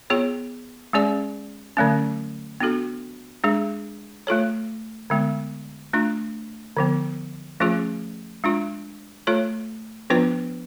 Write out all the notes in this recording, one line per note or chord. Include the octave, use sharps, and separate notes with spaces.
B3 F4 G#4 C#5
G#3 C#4 G#4 D5
D3 F#3 A3 C#4
B3 D4 F#4 A4
G#3 D4 G#4
A3 F4 A4 C#5
D3 G#3 B3
A3 D4 F4
D3 F3 B3
F3 A3 C#4 F4 G#4
G#3 D4 F4
A3 F4 A4 C#5
F3 B3 D4 F4 B4